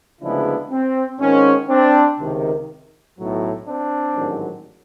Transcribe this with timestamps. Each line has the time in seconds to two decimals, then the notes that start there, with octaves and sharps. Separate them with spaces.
0.21 D2 C#3 F3 G#3 B3 D4 E4
0.71 C4
1.20 G#1 G#2 D#3 C#4
1.69 C4 D4
2.18 C#2 C3 D#3
3.17 B1 A2 F#3
3.67 C4 D4
4.15 A1 G#2 D#3 F#3